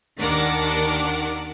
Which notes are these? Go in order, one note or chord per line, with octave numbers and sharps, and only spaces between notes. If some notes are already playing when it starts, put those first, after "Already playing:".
D#2 D#3 D4 A#4 F#5 D6